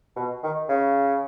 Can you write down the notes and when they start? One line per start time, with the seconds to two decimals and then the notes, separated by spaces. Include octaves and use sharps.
0.16 B2
0.43 D#3
0.69 C#3